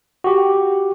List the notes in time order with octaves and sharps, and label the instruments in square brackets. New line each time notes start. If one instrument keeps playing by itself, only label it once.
[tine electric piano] F#4 G4